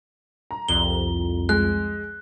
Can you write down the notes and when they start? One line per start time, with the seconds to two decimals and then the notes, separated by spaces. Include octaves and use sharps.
0.51 A#5
0.68 C2 F2 G7
1.49 G#3 F#6